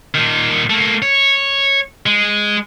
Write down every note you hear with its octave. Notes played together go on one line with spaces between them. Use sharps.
A#2 D#3
A3 A#3
C#5
G#3